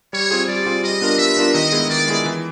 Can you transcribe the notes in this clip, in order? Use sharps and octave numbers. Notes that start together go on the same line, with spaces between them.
G3 C#5
C4 F4 G#4
G3 D5
C4 F4 G#4
G3 D#5
B3 D4 F4 A#4
G3 E5
B3 D4 F4 A#4
D#3 D#5
G#3 B3 E4 G#4
D#3 D5
G#3 B3 E4 G#4
E3